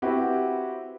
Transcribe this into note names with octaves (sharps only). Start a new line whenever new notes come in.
C4 E4 F#4 G4 B4